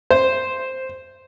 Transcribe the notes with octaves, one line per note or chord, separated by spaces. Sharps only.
C5